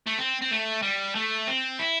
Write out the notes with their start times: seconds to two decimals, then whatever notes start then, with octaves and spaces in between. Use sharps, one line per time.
0.07 A3
0.18 C4
0.42 C4
0.51 A3
0.82 G3
1.15 A3
1.47 C4
1.79 E4